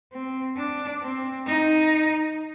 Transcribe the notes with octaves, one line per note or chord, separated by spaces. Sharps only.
C4
D4
C4
D#4